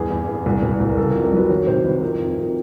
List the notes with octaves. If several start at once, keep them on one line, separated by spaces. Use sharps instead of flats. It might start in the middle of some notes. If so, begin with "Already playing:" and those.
Already playing: E2 G2 G#4
E2
E2
C2
C2
C2
A#4
C#3 A4
F2 A#4
A#4
F#3 B4
D#3 C#5
C3 C5
D#3 B4
F2 A#4
F2
F2
A#4